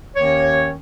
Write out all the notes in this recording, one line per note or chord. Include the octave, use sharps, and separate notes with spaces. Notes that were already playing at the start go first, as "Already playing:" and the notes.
D#2 D#3 A#3 C#4 C#5